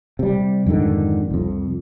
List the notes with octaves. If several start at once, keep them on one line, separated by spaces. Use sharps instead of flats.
C3 G3
F2 G#2 D3 D#3
C2 F2